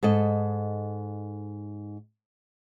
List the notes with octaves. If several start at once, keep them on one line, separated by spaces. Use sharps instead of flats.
G#2 A4 D#5